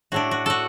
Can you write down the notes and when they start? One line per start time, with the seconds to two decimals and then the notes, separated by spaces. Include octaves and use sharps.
0.12 A2 A3 D4 F#4
0.31 F#4
0.46 F#4 A4